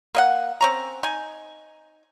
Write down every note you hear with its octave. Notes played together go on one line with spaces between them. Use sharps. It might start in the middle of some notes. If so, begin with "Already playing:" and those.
A#3 D#5 F#5
C4 C#4 A#5
D#4 G#5